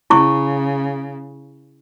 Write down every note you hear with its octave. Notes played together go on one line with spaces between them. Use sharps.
C#3 E4 C#6